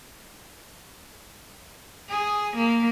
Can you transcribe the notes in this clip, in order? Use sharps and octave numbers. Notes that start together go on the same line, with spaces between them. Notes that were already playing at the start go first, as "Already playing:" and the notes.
G#4
A#3